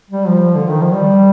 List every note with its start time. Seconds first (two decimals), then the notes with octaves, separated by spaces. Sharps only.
0.10 G3
0.28 F3
0.55 D3
0.68 D#3
0.82 F3
0.94 G3